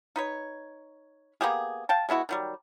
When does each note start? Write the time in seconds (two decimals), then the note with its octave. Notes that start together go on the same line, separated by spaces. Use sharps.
0.16 D#4 B4 C#5
1.41 A#3 B3 G4 G#4
1.89 F5 G5 A5
2.09 G#3 B3 E4 F#4
2.29 D#3 F#3 G3